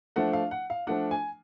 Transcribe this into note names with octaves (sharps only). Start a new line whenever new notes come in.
F3 A3 D4 F#5
F5
F#5
F5
F3 A3 D4 F#5
G#5